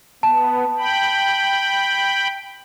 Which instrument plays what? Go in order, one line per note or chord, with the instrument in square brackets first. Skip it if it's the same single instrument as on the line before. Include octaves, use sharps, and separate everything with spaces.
[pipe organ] B3 [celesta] A5
[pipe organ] G5 B5